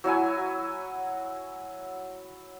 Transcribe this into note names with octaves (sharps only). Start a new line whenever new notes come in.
F#3 E4 F#4 G#5